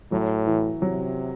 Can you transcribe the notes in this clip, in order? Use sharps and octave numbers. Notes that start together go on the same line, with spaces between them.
A2 F#3
E3
C3 F#3